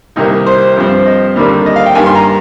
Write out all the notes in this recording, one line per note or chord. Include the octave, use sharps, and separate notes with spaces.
C2 C3 D#3 A#3 D#4
C5
G2 F3 C4
D#5
D#2 D3 G3 A#3 D4
D#5
F5
G5
G2 D#3 A#3 G#5
C6
A#5